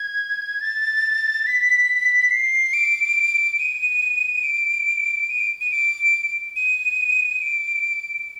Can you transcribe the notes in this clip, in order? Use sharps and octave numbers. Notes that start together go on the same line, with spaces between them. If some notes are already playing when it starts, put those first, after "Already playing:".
Already playing: G#6
A6
B6
C7
D7
D#7
D7
D#7
D7
D#7
D7
D#7
D7